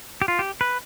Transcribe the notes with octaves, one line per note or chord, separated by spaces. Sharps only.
G4
F4
G4
B4